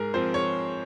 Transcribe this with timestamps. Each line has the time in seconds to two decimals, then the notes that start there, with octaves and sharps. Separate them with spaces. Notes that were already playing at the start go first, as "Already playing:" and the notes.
Already playing: G#2 G#4 A#4
0.14 F3 C4 C5
0.34 C#5